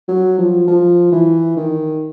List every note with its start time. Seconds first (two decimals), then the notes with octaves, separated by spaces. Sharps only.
0.08 F#3
0.38 F3
0.67 F3
1.12 E3
1.57 D#3